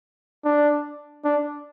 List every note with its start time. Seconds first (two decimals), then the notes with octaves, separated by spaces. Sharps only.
0.45 D4
1.25 D4